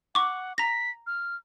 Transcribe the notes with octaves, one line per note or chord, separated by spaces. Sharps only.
F#5 C#6 D6
A#5 A#6 B6
F6